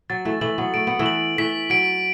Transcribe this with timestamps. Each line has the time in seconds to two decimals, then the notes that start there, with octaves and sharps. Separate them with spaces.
0.10 F#3 A6
0.25 E3 A3
0.41 E3 A3 F#7
0.58 F#3 B3
0.74 A3 D7
0.87 B3
0.99 E3 A3
1.06 F#7
1.38 E3 A3 B6
1.70 F#3 D7